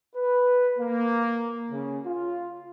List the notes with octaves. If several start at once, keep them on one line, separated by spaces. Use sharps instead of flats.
B4
A#3
C#3
F4